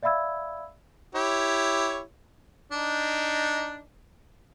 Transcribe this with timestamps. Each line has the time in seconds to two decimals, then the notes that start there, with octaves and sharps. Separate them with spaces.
0.03 D5 E5 F5 B5 E6 G#6
1.15 E4 G4 C#5
2.72 D4 D#4